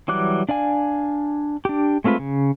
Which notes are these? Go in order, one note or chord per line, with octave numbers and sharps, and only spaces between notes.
E3 F#3 G3 D6 F#6
D4 D5 F5 G#5
D4 G4
G#3 A3 C4 F4 B4
C#3